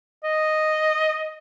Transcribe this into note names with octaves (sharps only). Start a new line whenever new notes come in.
D#5